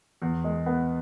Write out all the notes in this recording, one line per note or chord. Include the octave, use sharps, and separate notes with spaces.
E2
G#3
B3